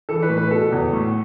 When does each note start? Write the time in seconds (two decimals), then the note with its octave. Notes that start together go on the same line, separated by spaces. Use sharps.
0.09 E3 A4
0.23 B4
0.29 A2
0.37 B4
0.51 B2 A4
0.72 E2
0.93 A2